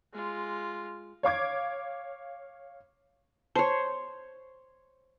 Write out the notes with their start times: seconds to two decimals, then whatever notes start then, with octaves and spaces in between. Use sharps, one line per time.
0.13 G#3 F4
1.23 C#5 F5 D6 G#6
3.56 C5 C#5 A5